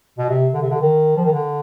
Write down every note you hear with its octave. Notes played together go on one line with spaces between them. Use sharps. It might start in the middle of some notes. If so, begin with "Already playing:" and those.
B2
C3
D3
C3
D3
D#3
F3
D#3
D3